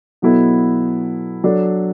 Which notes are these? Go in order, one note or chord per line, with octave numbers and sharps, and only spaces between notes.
B2 F#3 B3 E4 A4
F#3 D4 A4